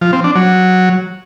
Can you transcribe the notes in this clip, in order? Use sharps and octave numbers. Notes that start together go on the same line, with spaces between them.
F3
C4
D4
F#3